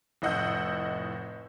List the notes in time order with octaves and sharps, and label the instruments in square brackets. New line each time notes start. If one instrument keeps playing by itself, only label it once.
[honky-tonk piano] F1 A2 D#5 F#5 E6 G6